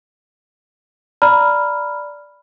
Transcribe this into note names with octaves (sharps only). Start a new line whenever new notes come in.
D5 A#5 B5 F6